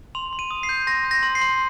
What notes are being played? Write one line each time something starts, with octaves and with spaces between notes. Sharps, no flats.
C6 F7
C6
D#7
D#6
C7
G6
C6 A#6
G6
A#6
C6
C7
C6